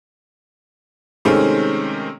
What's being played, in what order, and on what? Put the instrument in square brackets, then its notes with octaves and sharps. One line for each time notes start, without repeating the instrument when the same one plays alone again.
[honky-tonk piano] C3 D#3 G#3 A3 C4 C#4